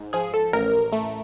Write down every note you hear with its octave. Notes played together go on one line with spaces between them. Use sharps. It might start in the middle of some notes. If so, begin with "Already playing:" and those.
Already playing: G#2
F3 G#4
A4
A1 A#4
A3